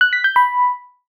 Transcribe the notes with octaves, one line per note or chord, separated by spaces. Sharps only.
F#6
B6
G6
B5